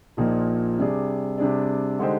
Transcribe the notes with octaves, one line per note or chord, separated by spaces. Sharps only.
A#1 A#2 F3 A#3 D#4
C3 G3 D4 G#4 D5
C3 G3 D4 G#4 D5
D3 G#3 D#4 G4 C5